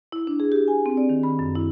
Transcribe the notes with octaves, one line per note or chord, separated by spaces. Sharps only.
E4
D4
G#4
G4
G#5
C4
D5
D#3
B5
F#2
E4